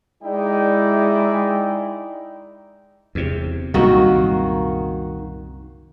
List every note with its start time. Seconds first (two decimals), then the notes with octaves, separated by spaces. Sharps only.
0.23 G#3 D#4 E4 D5 G5
3.15 E2 C3
3.74 C2 F#2 A#2 D#3 A#3 F#4